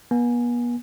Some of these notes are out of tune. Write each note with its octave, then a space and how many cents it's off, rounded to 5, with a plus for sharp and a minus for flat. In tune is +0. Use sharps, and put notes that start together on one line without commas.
B3 -40 G#5 +0